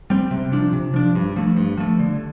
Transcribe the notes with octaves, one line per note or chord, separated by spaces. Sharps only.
G3 C4
C3
F3 D4
C3
F3 D4
G2
F3 A3
G2
F3 A3
D3